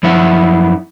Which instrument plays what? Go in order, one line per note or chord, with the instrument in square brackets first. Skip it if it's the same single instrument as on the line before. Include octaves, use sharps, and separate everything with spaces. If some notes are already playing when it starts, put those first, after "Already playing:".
[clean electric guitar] F#2 F3 E4 E5 F#5